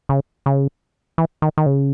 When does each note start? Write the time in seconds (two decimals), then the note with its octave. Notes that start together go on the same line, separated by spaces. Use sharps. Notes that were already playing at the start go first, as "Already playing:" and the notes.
0.09 C#3
0.46 C#3
1.18 E3
1.42 D#3
1.58 D#3
1.66 C#3